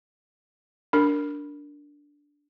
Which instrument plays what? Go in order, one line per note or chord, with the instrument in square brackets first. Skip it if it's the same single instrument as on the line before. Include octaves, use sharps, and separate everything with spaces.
[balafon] D4 A#4